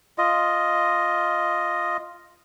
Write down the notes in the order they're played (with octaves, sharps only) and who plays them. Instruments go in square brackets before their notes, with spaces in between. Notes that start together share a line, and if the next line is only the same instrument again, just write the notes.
[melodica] F4 D#5